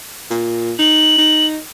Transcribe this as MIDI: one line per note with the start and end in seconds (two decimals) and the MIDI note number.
0.30 0.74 46
0.79 1.17 63
0.79 1.46 102
1.18 1.58 63